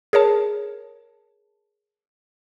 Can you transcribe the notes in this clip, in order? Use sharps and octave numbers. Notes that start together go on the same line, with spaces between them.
G#4 A#4 C#5 A5